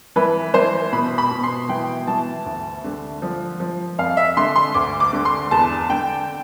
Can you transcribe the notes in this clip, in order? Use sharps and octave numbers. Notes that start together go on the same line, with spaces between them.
E3 B4
E3 C5
B2 B5
B5
B2
C6
E3 G5
E3 A5
D2
D3
F3
F3
F2 F5
E5
D3 C6
C6
D2 D6
D6
D3
C6
E2 A5
D3 G5